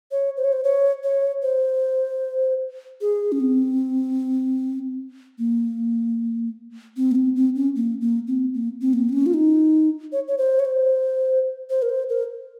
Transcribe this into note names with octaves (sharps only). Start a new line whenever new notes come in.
C#5
C5
C#5
C5
C#5
C#5
C5
G#4
C#4
C4
A#3
C4
A#3
C4
C4
C#4
A#3
A#3
C4
A#3
C4
A#3
C4
C#4
F4
D#4
C#5
C#5
C5
C#5
C5
C5
A#4
C5
A#4